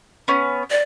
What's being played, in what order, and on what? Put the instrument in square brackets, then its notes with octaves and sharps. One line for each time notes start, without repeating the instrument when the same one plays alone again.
[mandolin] B3 C#4
[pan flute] D5